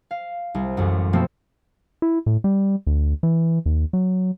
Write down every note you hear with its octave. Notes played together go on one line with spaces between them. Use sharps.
F5
C2
A1 F#2
B2 F3 A3 A#3 C4
E4
A2
G3
D2
E3
D#2
F#3